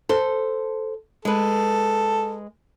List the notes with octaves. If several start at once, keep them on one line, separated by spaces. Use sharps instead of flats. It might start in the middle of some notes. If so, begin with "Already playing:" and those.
A4 C5
G#3 A4 B4